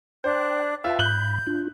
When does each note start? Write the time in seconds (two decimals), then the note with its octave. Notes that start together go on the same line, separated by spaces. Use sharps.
0.24 D4 C5 G5 F#6
0.84 F4 B4 E5 G5 A5
0.99 G#2 B5 F#6 G6 F#7 G7
1.47 D4 F4